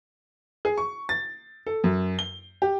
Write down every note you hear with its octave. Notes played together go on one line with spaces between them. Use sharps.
G#4
C#6
A6
A4
F#2
G7
G4